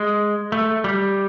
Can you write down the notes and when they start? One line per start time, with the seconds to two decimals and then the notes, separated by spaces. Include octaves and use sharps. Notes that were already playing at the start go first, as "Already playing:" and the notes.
Already playing: G#3
0.52 A3
0.84 G3